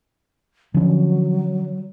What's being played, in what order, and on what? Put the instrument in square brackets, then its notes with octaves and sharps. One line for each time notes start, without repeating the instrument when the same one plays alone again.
[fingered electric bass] D3 F3 C#4 [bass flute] F#3